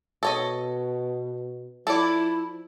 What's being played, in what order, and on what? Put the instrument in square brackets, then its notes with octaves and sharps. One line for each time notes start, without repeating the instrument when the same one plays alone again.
[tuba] B2 [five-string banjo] A4 C#5 D#5
[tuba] F3 [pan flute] E4 [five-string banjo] A4 D5